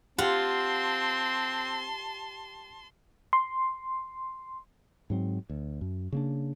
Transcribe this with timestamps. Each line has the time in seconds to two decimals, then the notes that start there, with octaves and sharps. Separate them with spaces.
0.18 C4 F4 G4 F#5 A5 C6
3.33 C6
5.10 G#2 F#3 C4
5.50 D2
5.81 F#2
6.12 C#3 A#3 D4